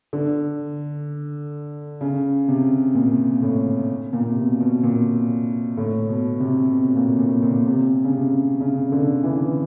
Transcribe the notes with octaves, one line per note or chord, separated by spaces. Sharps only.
D3
C#3
C3
A#2
A2
A#2
C3
B2
B2
A#2
A2
B2
C3
B2
A#2
A#2
A#2
C3
C#3
C3
C#3
D3
E3